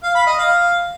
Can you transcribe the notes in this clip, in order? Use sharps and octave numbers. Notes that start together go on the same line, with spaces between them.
F5
B5
D#5
F5